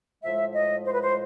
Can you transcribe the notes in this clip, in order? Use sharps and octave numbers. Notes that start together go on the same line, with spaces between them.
A2 F3 G#3 E5
D#5
C5
B4
C5